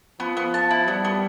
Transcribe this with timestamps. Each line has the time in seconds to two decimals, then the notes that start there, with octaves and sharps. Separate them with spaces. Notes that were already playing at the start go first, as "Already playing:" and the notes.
0.20 F3 B3
0.37 B3
0.54 A5
0.71 E4
0.88 G3 B3
1.04 B3